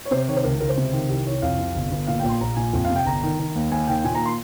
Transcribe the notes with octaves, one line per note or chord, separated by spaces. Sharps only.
C#5
C3 C5
D#3 C#5
C5
C#2 A#4
C#2 A#4
C5
C3
D#3
C2 G4
C2 C#5
F2 F5
C3
G1
G1
A#2 F5
A#1 G5
C6
A#1 A#5
A#2 G#5
F2
F5
C3
G5
G1 A#5
D#3
D#3
D#2
D#2 G#5
D#3 G5
A#2 G#5
A#5
C6